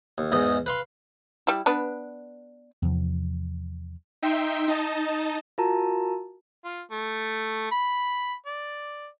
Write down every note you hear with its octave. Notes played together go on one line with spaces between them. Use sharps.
D#2
E2 G#2 D#5
B4 F5 C6
G3 E4
B3 D4 B4
E2 C3 F3
D#4 E5 G5 C6
D#4 D#5 A5
F4 F#4 A#4 A5 A#5
F4
A3
B5
D5